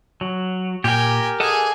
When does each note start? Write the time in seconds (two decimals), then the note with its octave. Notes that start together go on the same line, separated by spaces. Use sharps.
0.21 F#3
0.84 A#2 G4 A#4 G5 G#5
1.40 G#4 A4 D#5 F#5 G#5